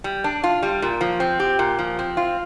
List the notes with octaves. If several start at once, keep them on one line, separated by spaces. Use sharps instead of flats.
G3
D4
F4
G3
A#2
F3
C4
G4
A#2
F3
C4
F4